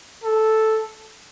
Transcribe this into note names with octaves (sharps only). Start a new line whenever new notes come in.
A4